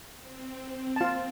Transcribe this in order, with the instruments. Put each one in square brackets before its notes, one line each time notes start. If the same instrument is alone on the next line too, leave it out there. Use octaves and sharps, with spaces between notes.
[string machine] C4
[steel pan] F4 A5